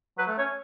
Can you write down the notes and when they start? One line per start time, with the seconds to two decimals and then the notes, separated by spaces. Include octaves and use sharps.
0.18 F#3 B4
0.28 A3
0.38 C#4 C#5